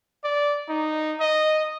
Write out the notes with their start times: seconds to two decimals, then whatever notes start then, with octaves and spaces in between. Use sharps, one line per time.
0.24 D5
0.69 D#4
1.20 D#5